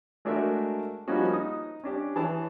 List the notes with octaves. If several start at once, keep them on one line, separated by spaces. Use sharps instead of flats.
G#3 A3 D4 F#4 A#4 E5
F3 G3 A#3 C#4 D#4 F#4
D#4 D#6
C#4 D4 G4
E3 G#4 C#5 A5